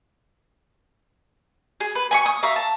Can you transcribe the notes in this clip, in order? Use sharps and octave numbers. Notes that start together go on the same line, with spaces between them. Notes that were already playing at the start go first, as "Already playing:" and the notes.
G#4
B4
G#5 B5 C#6
D#6
E5 F5 A#5 C#6
A5